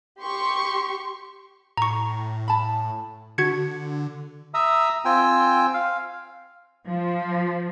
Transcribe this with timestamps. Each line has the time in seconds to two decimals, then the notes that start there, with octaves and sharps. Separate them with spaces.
0.21 G4 C6 C#6
1.77 A2 A#5 C#6
2.48 A5 B5
3.38 D3 F#4 G#6 C#7
4.54 E5 A#5 D#6 E6
5.05 C4 F4 G5 G#5 E6
5.74 F5
6.87 F3